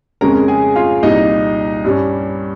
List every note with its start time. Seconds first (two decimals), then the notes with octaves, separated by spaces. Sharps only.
0.21 F2 C#3 G#3 C#4 A#4 A#5
0.48 G#4 G#5
0.76 F4 F5
1.03 C2 A#2 G3 D#4 D#5
1.84 G2 G3 C#4